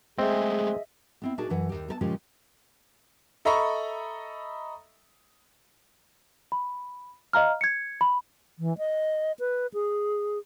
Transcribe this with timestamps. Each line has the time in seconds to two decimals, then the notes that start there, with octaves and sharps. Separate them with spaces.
0.18 G#3 A3 C4 G#4 D#5 E5
1.22 B3 C4 E4
1.38 A#2 D4 D#4 F#4 G#4 A5
1.50 F#2 E3 F#5
1.69 D#2 G4
1.88 B3 A#4 A5
2.01 A#2 C#3 F3 G#3 C#4 G4
3.45 A4 D#5 E5 A#5 B5 C#6
6.52 B5
7.33 D#5 F5 A#5 F6
7.61 G#6 C#7
8.01 B5
8.58 E3
8.78 D#5
9.39 B4
9.74 G#4